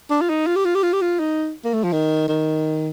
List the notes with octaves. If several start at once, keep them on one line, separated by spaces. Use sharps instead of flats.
D4
F4
D#4
F4
G4
F4
G4
F4
G4
F4
D#4
A#3
A3
F3
D#3
D#3